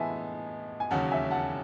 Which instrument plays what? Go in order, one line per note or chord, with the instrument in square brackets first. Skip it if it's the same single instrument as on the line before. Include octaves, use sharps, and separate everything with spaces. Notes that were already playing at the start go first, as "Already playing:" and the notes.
Already playing: [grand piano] A2 E3 G#3 B3 [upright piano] E5 G#5 A5
[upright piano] G#5
[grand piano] E1 D#2 C#3 F#3 C#4 [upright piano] F#5 A5
[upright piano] E5 G#5
F#5 A5